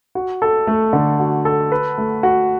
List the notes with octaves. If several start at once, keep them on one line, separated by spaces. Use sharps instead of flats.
F#4
A4
A3
D3
F#4
A4
B4
A3
F#4